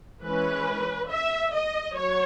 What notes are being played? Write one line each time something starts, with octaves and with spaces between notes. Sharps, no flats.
E3 G#3 C#4 B4
E5
D#5
F#3 C#5